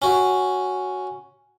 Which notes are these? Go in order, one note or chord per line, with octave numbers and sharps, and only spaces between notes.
C#4 F#4